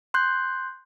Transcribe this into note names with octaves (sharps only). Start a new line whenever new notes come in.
C6 F#6 G6